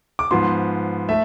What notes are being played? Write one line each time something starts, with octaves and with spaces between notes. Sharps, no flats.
D6
G#2 F3 B3 C6
A3 E5